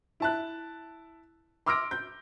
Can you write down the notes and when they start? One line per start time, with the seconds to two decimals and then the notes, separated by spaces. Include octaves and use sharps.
0.20 E4 A5 F#6
1.66 C6 D6 E6 F6 A#6 D7
1.91 G6